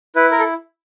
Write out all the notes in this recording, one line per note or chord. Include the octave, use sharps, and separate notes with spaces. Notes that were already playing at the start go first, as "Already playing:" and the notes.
E4 B4
A#4
A4